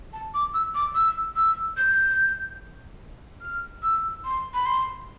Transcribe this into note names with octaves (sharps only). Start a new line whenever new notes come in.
A5
D6
E6
D6
E6
E6
G6
F6
E6
C6
B5
C6